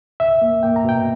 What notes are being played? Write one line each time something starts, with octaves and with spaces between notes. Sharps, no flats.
C#2 E5
A#3
A#3 G5
A#5
B2 G5